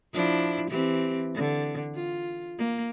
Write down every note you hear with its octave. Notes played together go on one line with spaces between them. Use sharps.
F3 D4 E4
E3 C4 G4
D3
F4
A#3